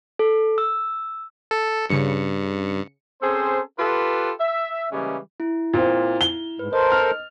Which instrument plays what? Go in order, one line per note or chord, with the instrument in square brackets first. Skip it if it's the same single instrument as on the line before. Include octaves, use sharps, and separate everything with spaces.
[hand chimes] A4
E6
[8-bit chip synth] A4
[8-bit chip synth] G2 [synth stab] C#3 C#7
[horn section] C4 C#4 G#4 A4 C5
F4 G4 A4 B4
E5
C#3 E3 G3 G#3 A#3 C#4
[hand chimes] E4
[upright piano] A#2 C4
G7
[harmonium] G#2 [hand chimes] B4
[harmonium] A4 A#4 C5 [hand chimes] D#5
[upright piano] F6